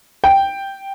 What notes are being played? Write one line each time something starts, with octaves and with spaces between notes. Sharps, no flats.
G5